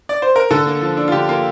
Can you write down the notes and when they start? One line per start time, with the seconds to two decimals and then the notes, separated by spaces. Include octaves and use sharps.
0.09 D5
0.22 C5
0.36 A#4
0.51 D3 A4
0.66 A#3
0.82 F3
0.97 D4
1.08 F4
1.12 D3 G4
1.29 A#3 F4